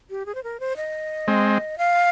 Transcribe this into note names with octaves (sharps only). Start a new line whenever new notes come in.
G4
G#4
C5
A#4
C5
D#5
G#3 C4
F5